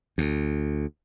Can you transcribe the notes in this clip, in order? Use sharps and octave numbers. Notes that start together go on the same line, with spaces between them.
D2